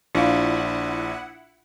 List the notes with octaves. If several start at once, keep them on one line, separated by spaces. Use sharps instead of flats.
A#1 D4 E4 F4 F5 F#5